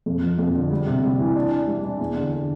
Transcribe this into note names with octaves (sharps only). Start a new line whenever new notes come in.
F2
F3
F2
D3
G3
C3
G3
E3
D4
D4
G3
D4
E2
D3
D3